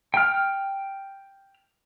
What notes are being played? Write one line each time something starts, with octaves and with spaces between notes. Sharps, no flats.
G5 F6